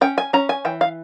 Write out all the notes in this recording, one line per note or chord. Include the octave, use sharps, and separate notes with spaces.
C#4 G5
G#5
C#4 A#5
G#5
E3 G5
F5